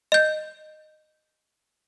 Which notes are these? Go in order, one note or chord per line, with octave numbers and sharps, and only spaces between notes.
D#5 G6